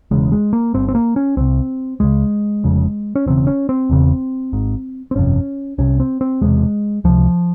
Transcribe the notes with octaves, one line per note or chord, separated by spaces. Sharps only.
E1 E2 C#3 G#3
G#3
A#3
G1 G2 C4
C4
A#3
C#4
C2 C3 C4
C#2 C#3 G#3
F1 F2 C#3
C#4
E1 E2 C#3 C4
C#4
C4
E1 E2 C#3
G#1 G#2
C4
G1 F2 C3 C#4
C2 C3 C#4
C4
C4
E1 E2 C3 G#3
C#2 C3 F3